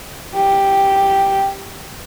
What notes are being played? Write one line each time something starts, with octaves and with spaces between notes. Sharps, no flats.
G4